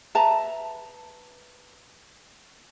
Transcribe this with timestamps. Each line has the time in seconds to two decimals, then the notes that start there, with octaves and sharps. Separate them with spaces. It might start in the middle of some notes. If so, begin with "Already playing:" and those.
0.15 B4 E5 A5 A#5